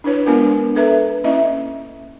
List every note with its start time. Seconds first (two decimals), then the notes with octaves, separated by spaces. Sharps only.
0.04 D4 E4 B4 C#5
0.26 G#3 B3 D4 F4 A#4 G5
0.75 D4 A4 B4 E5 A#5
1.24 A#3 C#4 E4 D#5 E5